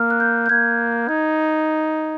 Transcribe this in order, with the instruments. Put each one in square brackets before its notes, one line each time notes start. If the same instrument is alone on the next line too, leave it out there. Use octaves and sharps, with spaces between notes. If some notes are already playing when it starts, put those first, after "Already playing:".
Already playing: [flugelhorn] A#3 [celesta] F6
[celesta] F#6
G6
G6
[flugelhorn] A#3 [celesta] G#6
[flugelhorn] D#4 [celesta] G#6